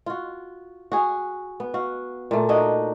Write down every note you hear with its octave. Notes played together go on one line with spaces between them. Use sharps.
F4 F#4
F#4 G#4
B3
F#4 F5
A#2 A3
D4 D#4 F#4 D#5